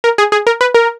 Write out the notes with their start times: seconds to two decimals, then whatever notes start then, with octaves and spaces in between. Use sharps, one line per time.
0.04 A#4
0.18 G#4
0.32 G#4
0.47 A#4
0.61 B4
0.74 A#4